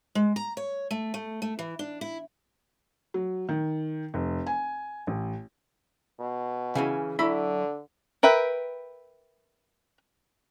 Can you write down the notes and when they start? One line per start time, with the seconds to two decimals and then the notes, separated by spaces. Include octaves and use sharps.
0.15 G#3
0.36 A#5
0.57 C#5
0.91 A3
1.14 A3
1.42 A3
1.59 E3
1.79 D4
2.01 E4
3.14 F#3
3.49 D#3
4.14 F1
4.47 G#5
5.07 A1
6.20 B2
6.75 C#3 E3 C#4
7.19 D3 F#3 E4 B5
8.23 A#4 B4 E5 G5